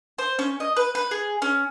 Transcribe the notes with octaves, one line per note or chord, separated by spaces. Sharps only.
C5
C#4
D#5
B4
B4
G#4
C#4